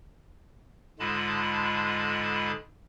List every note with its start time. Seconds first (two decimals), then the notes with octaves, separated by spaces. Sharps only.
0.99 G#2 D3 G#3 F4 A5 B5